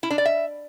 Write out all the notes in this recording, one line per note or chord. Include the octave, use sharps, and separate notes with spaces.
E4
D4
D5
E5